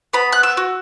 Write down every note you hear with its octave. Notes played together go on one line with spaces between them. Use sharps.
B3 B5
F#6
E6
F#4